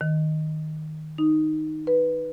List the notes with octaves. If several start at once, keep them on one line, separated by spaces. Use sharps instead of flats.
D#3
D#4
B4